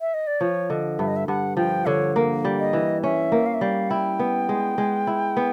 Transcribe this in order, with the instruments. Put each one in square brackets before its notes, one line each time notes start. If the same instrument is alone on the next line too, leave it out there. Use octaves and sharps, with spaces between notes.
[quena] E5
D#5
D5
[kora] F3 [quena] C#5
[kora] D3 [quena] D#5
[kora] G2 [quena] E5
[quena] D#5
E5
[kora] G2 [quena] F#5
[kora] F3 [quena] G5
[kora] D3 [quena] C#5
[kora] A#3
G3
[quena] D#5
[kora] E3
[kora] C#4 [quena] E5
[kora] A#3
[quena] F5
E5
[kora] G3 [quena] F5
[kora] E4 [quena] G5
[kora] B3
G#3
G#3
E4
B3